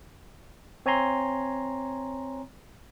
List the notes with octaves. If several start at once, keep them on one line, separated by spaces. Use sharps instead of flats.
C4 C#5 G#5 A#5 C6